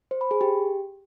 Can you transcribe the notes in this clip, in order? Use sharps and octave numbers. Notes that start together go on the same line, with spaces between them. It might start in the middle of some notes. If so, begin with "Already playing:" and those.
C5
B5
G#4
G4